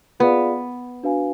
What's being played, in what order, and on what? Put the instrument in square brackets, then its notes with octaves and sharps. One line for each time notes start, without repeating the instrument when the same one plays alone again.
[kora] B3 [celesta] F4 G#4 D5 F5
[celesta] D4 F#4 B4 F5 G#5